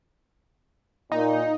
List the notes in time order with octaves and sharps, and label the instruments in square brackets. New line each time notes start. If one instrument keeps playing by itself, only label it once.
[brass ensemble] A#2 [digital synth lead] D#4